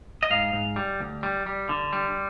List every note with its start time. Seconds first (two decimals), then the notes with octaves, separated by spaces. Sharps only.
0.23 D#5
0.30 G#2 F5
0.53 G#2
0.76 G3
1.00 D2
1.23 G3
1.46 G3
1.69 D3
1.93 G3